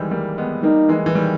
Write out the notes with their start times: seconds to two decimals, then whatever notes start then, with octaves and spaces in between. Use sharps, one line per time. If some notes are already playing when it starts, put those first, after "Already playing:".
Already playing: D#3 E3 G3 G#3
0.11 G3 A#3
0.38 G#3 B3
0.63 G3 A#3 D#4
0.89 E3 G#3
1.06 E3
1.15 D#3 G3